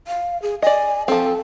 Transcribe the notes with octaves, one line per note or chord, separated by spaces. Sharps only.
F5
G#4
D5 D#5 G#5
F3 C4 A4